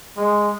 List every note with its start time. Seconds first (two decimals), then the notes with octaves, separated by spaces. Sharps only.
0.17 G#3